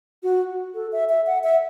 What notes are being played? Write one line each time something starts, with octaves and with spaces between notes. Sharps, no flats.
F#4
A4
E5
E5
F#5
E5